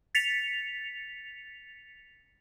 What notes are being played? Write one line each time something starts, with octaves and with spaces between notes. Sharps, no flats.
A6 B6 C#7 F7